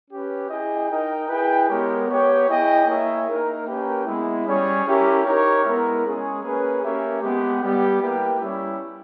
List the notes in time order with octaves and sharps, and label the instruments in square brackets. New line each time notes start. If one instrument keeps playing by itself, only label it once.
[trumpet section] C#4 G4 B4
E4 G#4 D#5 G5
D#4 A#4 D#5 G5
E4 G#4 B4 G5
G#3 B3 G4 A#4 C#5
B3 G4 C#5 G5
E4 G#4 D#5 G5
A#3 E4 G#4 C#5 E5
A#3 D#4 A#4
A#3 C#4 G4 B4 G5
G#3 B3 E4
G3 C#4 G#4 C#5
C#4 E4 G4 A#4
D#4 G4 A#4 C#5
G#3 B3 E4 A#4
G#3 C#4 G#4 C#5
A#3 C#4 G#4 B4
A#3 C#4 G4 C#5 E5
G#3 B3 G4
G3 B3 G4
A#3 E4 G4 B4 G5
G3 C#4 E4 G4 C#5